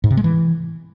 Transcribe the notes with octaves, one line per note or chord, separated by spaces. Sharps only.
G#2
C3
G#3
E3